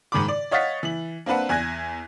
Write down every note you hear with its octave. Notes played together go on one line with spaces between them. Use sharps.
G#2 D#3 B5 D6
D5
C#5 D#5 F5 F#5 A6 B6
E3 F#7
A#3 C4 D4 B4 F#5
E2 G#5 F#6 G#6 A#6